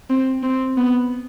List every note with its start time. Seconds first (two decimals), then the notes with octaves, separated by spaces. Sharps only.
0.10 C4
0.44 C4
0.77 B3